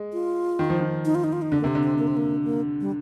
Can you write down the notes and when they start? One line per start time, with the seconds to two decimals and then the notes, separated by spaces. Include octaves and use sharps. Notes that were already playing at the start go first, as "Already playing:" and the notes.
Already playing: G#3
0.13 F4
0.59 D#3
0.70 F3
0.80 D#3
1.05 D#4
1.15 F4
1.24 D#4
1.33 F4
1.42 D#4
1.51 D3 D4
1.61 A#3
1.64 C3 C4
1.75 D3
1.83 C4
1.98 A#3
2.07 C4
2.17 A#3
2.44 A#3
2.80 G3